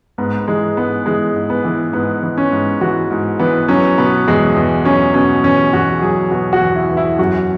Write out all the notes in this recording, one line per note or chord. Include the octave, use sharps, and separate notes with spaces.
G#2 B3
B3
E3 G#3
G#2 B3
E3 G#3
G#2
B3
E3
G#2 B3
E3
C#4
G#2
E3 F#4
G#2
E3 B3
F#3 C#4
B2 B3
E2 G#3
E2
F#3 C#4
B2 C#4
E2 C#4
E2 F#4
F#3 G#4
B2 F#4
F#4
E2
E4
E2
E4
F#2 F#4